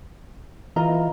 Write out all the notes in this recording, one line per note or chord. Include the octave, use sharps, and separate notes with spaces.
E3 F4 D#5 A#5